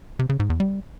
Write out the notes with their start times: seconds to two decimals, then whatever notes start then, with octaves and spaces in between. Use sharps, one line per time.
0.19 C3
0.29 C#3
0.40 G#2
0.50 E2
0.60 G3